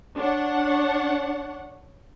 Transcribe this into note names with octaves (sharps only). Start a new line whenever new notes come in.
D4 C#5 F#5